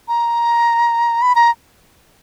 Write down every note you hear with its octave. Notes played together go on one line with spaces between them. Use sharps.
A#5
B5
A#5